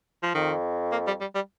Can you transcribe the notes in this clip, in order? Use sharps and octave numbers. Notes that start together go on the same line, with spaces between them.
F3
F2 D#3
A#3
G3
G3
G3